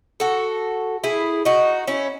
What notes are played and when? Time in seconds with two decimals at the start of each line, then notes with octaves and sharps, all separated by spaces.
0.20 F#4 A4
1.04 E4 G#4
1.45 D#4 F#4
1.88 C#4 E4